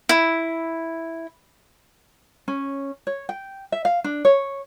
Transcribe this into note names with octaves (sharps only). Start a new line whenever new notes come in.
E4
C#4
C#5
G5
E5
F5
D4
C#5